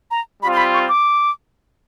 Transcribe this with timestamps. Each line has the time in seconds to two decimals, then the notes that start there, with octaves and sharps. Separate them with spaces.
0.11 A#5
0.42 G3 C4 F4 B5
0.53 C6
0.57 B5
0.74 C#6
0.89 D6